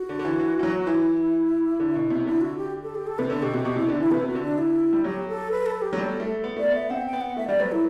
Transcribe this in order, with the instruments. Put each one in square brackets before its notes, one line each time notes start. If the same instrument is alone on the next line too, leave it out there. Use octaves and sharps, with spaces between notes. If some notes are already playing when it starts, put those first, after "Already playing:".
Already playing: [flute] F#4
[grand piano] D3
D3
E3
E3
E3
F#3
[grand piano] E3 [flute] E4
[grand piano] D3
B2
C3
[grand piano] D3 [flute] E4
[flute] F#4
G4
A4
G4
A4
[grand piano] C3 [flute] B4
[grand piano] D3 [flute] A4
[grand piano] B2 [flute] G4
[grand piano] C3 [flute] F#4
[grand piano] B2 [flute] G4
[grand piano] C3 [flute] E4
[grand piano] D3 [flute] D4
[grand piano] E3 [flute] E4
[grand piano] C3 [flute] B4
[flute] F#4
[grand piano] D3
[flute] D4
E4
[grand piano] G3
[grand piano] F#3 [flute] G4
[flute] A4
B4
A4
G4
[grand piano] F#3
[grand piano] G3 [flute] A4
[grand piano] A3
B3
[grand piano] A3 [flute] D5
[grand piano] B3 [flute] E5
[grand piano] C4 [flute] F#5
[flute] G5
[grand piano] B3
[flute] F#5
[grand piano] A3 [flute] E5
[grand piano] G3 [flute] D5
[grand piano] F#3 [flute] B4
[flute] E4